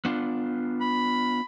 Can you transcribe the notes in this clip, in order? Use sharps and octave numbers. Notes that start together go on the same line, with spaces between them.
B3 D4 F4
B5